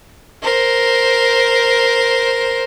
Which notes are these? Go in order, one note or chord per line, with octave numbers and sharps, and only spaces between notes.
A#4 C5